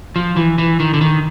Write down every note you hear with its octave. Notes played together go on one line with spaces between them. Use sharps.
F3
E3
E3
D#3
D3
D#3